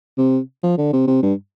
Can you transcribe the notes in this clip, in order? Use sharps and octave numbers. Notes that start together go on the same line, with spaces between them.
C3
F3
D3
C3
C3
G2